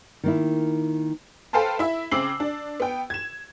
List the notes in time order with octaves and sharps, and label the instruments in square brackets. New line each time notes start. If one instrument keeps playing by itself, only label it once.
[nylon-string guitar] D#3 A#3 E4
[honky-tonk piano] A4 B4 C5 F5 G5 A5
E4 E5
C#3 C4 D6 E6 C7 F#7
D4
B3 G5
G#6 E7